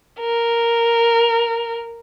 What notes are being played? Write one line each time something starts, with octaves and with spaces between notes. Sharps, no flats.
A#4